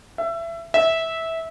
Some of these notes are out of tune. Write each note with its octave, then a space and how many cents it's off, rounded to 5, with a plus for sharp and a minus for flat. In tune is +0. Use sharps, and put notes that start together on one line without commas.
E5 +25
E5 -15